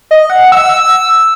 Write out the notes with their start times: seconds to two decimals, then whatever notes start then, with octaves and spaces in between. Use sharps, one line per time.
0.11 D#5
0.30 F#5
0.52 E6